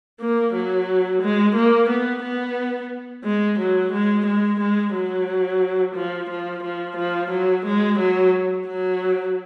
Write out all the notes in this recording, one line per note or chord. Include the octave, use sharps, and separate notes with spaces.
A#3
F#3
G#3
A#3
B3
B3
G#3
F#3
G#3
G#3
G#3
F#3
F3
F3
F3
F3
F#3
G#3
F#3
F#3